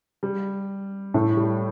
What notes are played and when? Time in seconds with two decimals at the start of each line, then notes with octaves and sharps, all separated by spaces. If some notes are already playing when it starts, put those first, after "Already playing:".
0.23 G3
1.14 A2 A3
1.36 G3